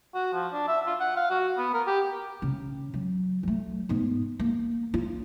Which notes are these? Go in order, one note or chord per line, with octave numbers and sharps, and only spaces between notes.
F#4
F3
D4
E5
F4
F#5
F5
F#4
B3
A#4
G4
C#3
F#3
F#3 A3
G#2 B3
A#3
F4